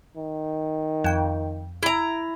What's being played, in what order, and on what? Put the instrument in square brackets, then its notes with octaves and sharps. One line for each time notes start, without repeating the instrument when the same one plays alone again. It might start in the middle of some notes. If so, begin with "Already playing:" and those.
[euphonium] D#3
[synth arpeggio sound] F2 G5
[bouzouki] E4 A#5